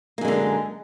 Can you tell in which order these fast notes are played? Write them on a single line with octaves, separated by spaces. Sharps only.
A#3 F#2 G#3 D3